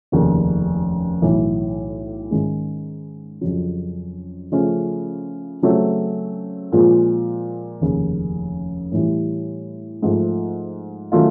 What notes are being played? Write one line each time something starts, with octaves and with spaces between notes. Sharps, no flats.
F1 D#2 C#3
B1 A2 E3
G#2 D#3 G#3 C#4
F2 C#3 F#3
C#3 F3 A3 C#4
C#3 F#3 A3 C4
A#2 F3 G#3
F1 D#2 C#3
A2 E3 G3
G#2 F3 A3
D#3 F#3 A3 C#4 F4